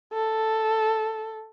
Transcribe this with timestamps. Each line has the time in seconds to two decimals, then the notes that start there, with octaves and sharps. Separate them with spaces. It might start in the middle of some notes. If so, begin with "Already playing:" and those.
0.13 A4